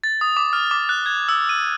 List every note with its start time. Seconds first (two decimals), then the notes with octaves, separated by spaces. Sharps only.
0.04 A6
0.21 D#6
0.37 D6
0.53 F6
0.71 D6
0.89 F#6
1.06 G#6
1.29 E6
1.49 D#7